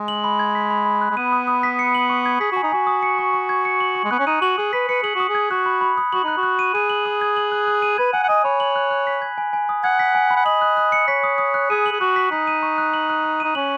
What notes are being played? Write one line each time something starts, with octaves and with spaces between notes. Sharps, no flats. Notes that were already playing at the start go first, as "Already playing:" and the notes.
Already playing: G#3
F#7
B5
G#6
B6
B5
B5
F#6
G#3
B3 D#7
D#6
D#6
B6
C#7
F#7
C#6
G#6
G#4 B6
F#4 G#5
D#4
F#4 G#5
D#6
C#7
C#6
C#6
G#6
C#7
F#7
C#6
G#3
B3 F#6
C#4
D#4 D#7
F#4 F#7
G#4 D#6
B4 B6
B4 C#7
G#4 F#7
F#4 D#6
G#4
G#6
F#4 F#6
B5
B5
D#6
F#4 F#7
D#4 F#6
F#4
F#6
D#7
G#4 D#7
F#7
D#6
G#6
F#7
F#6
F#6
D#7
B4 G#6
F#5 G#5
F#5
D#5 G#5
C#5 B5
F#7
F#6
F#6
B6
G#6
G#5
G#5
D#6
F#5 G#6
B6
G#5
B5
F#5
D#5 F#7
F#6
F#6
C#7
C#5 B6
D#6
D#6
F#6
G#4 D#7
F#7
G#4
F#4 F#6
B6
D#4 B6
D#7
C#6
F#6
F#7
F#6
F#6
D#4 D#7
C#4 F#7